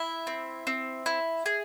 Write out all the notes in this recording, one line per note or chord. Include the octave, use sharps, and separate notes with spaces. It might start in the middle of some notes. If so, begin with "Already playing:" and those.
Already playing: E4 E5
C4
C4
E4
G#4